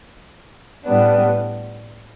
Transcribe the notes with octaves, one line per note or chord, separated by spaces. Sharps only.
A2 G3 B3 D4